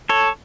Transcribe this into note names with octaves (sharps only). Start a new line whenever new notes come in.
A4 C#5